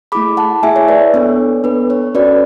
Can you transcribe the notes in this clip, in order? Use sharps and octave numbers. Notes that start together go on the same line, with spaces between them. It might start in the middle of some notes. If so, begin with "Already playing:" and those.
A3 E4 G#4 B5 D6
F#5 A5
A3 E4 G#4 E5 G#5
C#5 E5
B4 D5
B3 D4 A4 C#5
B3 D4 A4 B4
C#5
C#4 F#4 A4 B4 D5